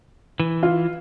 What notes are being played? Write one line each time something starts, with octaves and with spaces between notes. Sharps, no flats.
E3
F4